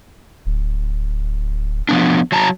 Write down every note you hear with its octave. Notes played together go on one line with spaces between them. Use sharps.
D1
F3 B3 D4
F#3 A5 A#5